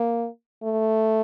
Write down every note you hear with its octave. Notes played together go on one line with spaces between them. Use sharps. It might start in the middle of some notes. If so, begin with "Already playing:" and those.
Already playing: A#3
A3